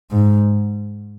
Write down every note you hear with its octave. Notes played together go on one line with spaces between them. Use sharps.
G#2